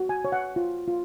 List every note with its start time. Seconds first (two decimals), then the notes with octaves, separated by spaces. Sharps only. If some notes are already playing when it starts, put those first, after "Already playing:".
Already playing: F#4
0.09 G#5
0.25 C#5
0.32 F#5
0.56 F4
0.88 F4